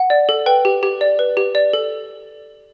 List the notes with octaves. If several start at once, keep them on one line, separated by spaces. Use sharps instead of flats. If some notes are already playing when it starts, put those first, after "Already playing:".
Already playing: F#5
D5
A4
B4 G5
G4
G4
D5
B4
G4
D5
A4